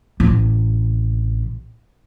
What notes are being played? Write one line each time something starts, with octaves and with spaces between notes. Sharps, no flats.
A1 C3